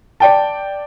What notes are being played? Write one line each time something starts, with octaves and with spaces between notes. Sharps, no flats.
D5 G5 A5